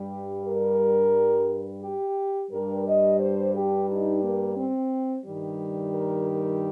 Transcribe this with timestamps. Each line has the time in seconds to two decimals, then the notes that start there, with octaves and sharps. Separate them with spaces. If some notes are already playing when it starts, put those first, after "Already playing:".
Already playing: G2 G3 G4
0.43 A#4
1.81 G4
2.49 G2 G3 A#4
2.85 D#5
3.19 C5
3.53 G4
3.88 D#4
4.22 A#3
4.57 C4
5.24 G2 D#3 G3
5.94 A#4
6.28 A#4